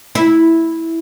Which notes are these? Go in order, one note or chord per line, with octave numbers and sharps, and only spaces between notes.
E4